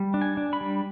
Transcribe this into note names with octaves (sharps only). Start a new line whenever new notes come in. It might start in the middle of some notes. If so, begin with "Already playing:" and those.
Already playing: G3
D4
G#5
D4
B5
G3